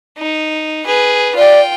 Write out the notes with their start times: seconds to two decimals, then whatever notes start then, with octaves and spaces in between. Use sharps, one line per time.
0.18 D#4
0.84 G#4 B4
1.36 F4 D5 G5